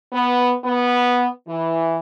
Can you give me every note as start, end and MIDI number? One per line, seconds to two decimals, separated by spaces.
0.12 0.53 59
0.65 1.26 59
1.49 1.98 52